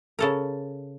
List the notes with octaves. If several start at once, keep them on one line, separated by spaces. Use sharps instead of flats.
C#3 A4 A#4